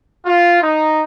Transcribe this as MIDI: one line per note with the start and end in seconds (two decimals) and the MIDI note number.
0.24 0.57 65
0.61 1.02 63